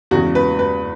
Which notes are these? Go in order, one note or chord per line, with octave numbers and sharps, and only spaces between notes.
E2 C#3 G#3 F#4
B4
B4